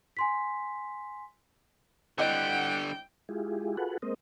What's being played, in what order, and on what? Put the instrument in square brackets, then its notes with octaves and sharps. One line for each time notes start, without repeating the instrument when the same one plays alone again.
[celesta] G#5 C6 B6
[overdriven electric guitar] D3 G3 [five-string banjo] C4 E4 D#5 [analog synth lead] F#5 [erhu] G5
[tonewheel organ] G#3 E4 F4 G4 G#4
F4 F#4 G#4 A4 B4 F#5
G#3 A#3 C4 A#4 C5 D#5